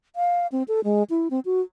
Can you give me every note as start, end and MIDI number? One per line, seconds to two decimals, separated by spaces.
0.16 0.47 77
0.52 0.63 60
0.68 0.80 69
0.84 1.03 56
1.10 1.28 64
1.31 1.40 60
1.45 1.61 66